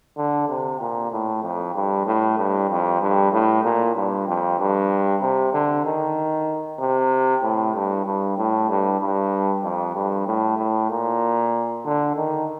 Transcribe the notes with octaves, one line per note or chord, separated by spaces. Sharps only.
D3
C3
A#2
A2
F2
G2
A2
G2
F2
G2
A2
A#2
G2
F2
G2
C3
D3
D#3
C3
A2
G2
G2
A2
G2
G2
F2
G2
A2
A2
A#2
D3
D#3